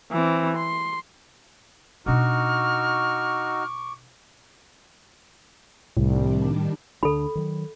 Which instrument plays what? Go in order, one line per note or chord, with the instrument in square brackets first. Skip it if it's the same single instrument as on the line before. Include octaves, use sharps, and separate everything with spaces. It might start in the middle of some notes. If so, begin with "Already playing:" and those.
[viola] E3 C4
C6
[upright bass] B2 D4 [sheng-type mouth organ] D#4 F#4 [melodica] C#6 D6 [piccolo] F6
[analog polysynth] C2 [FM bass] A2 [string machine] D#3 G3 D4
[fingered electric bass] D2 D3 D4 [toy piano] A4 B5
[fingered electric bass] D#3 F#3